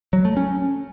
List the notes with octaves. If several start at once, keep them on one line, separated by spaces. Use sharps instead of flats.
F#3
A3
C#4